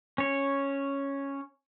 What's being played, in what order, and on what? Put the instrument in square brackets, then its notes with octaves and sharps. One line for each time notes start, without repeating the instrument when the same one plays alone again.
[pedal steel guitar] C#4 C#5